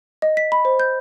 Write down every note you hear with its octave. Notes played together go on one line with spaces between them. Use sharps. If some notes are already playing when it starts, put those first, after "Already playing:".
D#5
B6
B5
C5
G6